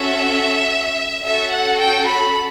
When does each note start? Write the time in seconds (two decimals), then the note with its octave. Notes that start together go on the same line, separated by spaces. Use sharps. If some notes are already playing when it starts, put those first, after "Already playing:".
Already playing: C#4 F#4 A4 E5
1.24 C#4 F#4 A4 E5
1.52 F#5
1.80 G5
2.08 B5